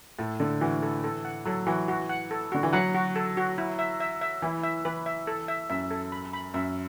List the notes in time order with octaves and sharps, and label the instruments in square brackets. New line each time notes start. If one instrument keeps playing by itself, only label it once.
[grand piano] A2 [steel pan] A4
[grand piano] D3 [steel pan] A4
[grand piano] E3 [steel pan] F#4
[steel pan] A4
A4
F#5
[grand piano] F#3 [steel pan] A4
[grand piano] E3 [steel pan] F#4
[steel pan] F#4
F#5
A4
[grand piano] D3 [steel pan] F#4
[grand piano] E3
[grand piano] F#3 [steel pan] F#5
[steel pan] F#4
A4
F#4
E4
E5
E5
E5
[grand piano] E3 [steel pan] E4
[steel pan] E5
[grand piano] E3 [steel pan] B4
[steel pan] E5
A4
E5
[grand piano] F#2 [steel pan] E5
[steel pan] A4
B5
B5
[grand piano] F#2 [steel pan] E5